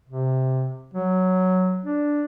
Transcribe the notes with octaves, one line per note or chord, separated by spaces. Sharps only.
C3
F#3
D4